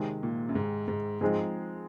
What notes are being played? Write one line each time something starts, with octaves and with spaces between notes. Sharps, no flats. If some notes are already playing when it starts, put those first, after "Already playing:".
Already playing: C3 D#3 G#3
A#2
F#2
G#2
G#2
G#2 F3 G#3 C4 D#4 G#4